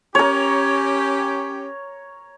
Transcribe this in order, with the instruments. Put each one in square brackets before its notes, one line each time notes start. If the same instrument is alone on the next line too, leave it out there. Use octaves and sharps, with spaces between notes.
[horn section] C#4 G4 [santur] A#4 C#5